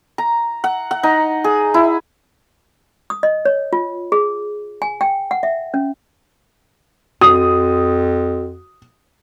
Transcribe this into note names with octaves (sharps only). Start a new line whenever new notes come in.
A#5
F#5
F#5
D#4
G#4
E4
D#6
D#5
C#5
F4
G#4
G#5
G5
F#5
E5
C#4
F2 F#4 D#6